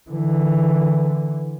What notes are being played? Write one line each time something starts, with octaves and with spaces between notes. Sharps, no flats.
D3 E3